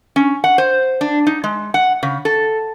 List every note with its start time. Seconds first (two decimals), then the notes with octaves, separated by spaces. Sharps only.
0.16 C#4
0.44 F#5
0.58 C5
1.01 D4
1.27 D#4
1.44 G#3
1.74 F#5
2.03 C#3
2.25 A4